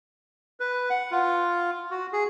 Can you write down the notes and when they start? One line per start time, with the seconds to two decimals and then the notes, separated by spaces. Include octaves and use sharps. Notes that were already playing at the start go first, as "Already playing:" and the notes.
0.60 B4
0.90 F#5
1.11 F4
1.91 F#4
2.13 G#4